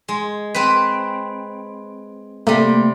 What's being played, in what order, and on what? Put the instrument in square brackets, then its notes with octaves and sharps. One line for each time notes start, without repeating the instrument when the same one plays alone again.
[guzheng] G#3
C4 B4
[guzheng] C3 G3 [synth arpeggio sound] A3 A#3